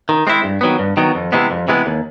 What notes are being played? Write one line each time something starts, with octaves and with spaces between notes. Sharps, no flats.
D#3
G#3 C4 E4
G2
D#3 F#3 B3
G2
D#3 F#3 B3
F2
C3 E3 G#3 B3
F2
C3 E3 G#3 B3
D#2